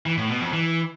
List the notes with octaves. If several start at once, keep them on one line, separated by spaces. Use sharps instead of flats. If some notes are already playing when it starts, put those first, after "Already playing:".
E3
A2
B2
F2
E3